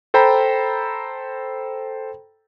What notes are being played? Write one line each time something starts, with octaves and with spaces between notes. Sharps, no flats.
A4 C5 G5 A#5 B5